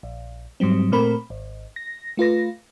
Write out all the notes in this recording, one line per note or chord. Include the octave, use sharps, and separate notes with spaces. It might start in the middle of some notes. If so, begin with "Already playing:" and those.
A#1
G#2 F#3 G3 C4
A#2 A3 C4 A#4 B5
G#1
A#6
A3 F4 B4 A#6